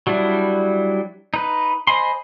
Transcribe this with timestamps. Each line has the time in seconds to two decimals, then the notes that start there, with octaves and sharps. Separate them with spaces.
0.07 F#3 G3 D4 E4
1.34 D#4 B4
1.87 C5 D#5 G#5 B5 C6